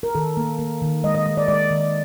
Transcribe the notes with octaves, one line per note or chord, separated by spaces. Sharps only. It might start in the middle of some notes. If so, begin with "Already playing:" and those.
A#4
D#3 A4
A#3
A#3
D#3
G#3 D#5
D#5
G#3 D#5
D5
G#3 D5
D#3